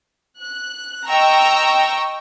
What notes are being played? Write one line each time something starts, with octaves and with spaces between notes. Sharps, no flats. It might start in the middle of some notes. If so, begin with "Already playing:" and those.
F#6
D#5 G5 A#5 C#6 E6